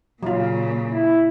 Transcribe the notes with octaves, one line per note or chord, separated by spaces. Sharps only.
A#2 C#3 F#3 F4
E4